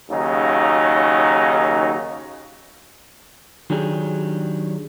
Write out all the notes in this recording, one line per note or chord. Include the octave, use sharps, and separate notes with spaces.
D#2 C#3 F#3 D#4
D#3 F#3 D4 G4 G#4